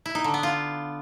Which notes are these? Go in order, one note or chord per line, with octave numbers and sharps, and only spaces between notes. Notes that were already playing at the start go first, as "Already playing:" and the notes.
E4
D#4
D3
B3
F4